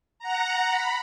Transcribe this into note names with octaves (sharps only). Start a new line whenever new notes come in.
F#5 A#5
B5